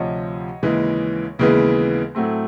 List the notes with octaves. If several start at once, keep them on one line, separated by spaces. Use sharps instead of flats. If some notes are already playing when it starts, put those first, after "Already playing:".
Already playing: D2 C3 F3 C#5 D#5
D#2 C#3 E3 G#3
D#2 C#3 E3 G#3 B3
A2 F#3 A3 C4